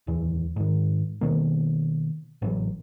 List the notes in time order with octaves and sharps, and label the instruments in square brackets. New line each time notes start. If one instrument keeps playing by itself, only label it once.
[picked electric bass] D1 E2 E3
G#2 D#3
B2 D#3 A#3
A1 A2 E3 F#3